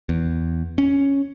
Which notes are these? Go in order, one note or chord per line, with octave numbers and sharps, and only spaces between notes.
E2
C#4